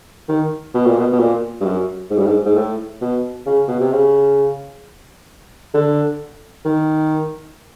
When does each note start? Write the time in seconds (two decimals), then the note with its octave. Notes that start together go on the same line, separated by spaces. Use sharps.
0.29 D#3
0.74 B2
0.86 A#2
0.98 B2
1.12 B2
1.19 A#2
1.61 G2
1.64 F#2
2.10 G#2
2.18 G2
2.27 G#2
2.45 G#2
2.56 A2
3.01 B2
3.46 C#3
3.68 B2
3.80 C3
3.92 C#3
5.74 D3
6.65 D#3